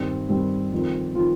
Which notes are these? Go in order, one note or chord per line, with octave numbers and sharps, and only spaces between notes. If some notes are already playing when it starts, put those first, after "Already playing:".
Already playing: G2 D#3 G3 C4
G2 D#3 G3 C4
F2 D#3 C4
D#3 C4 F4